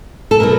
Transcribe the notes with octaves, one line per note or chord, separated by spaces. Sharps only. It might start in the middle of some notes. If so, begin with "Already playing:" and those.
A4
B2 F#3 A#4